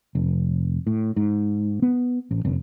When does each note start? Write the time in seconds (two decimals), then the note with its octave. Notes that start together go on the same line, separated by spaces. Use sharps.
0.15 F1
0.87 A2
1.16 G#2
1.82 B3
2.31 A1
2.45 F1